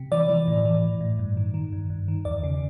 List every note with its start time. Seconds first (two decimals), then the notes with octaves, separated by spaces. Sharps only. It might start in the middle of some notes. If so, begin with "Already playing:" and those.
Already playing: C3
0.12 E3 D5
0.29 E3
0.48 A2
0.65 E3
0.84 A2
1.01 A2
1.19 G2
1.37 D#3
1.54 D#3
1.72 G2
1.90 G2
2.08 D#3
2.25 E2 D5
2.43 C#3